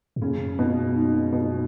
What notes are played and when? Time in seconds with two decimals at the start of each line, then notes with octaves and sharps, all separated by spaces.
0.16 G#2
0.22 F#2 C#3
0.59 B2
0.95 G#2
1.33 B2